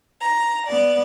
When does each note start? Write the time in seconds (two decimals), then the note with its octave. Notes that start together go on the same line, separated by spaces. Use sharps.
0.19 A#5
0.66 B3 D5